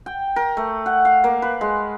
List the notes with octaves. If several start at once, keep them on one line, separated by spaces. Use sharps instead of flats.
G5
A#4
A3
F#5
F5
A#3
B4
G#3